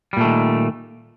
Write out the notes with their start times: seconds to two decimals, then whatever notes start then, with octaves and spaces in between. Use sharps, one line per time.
0.13 G3
0.17 A#2
0.21 A3
0.24 D#3